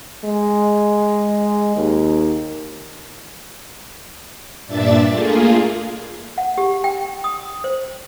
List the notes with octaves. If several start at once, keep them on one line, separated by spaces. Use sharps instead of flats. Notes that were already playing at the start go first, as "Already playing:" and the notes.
G#3
D#2
G2 A#2 D4 D5 E5 A6
A3 A#3 F4 G#4
F#5
G4
G5
D#6
C5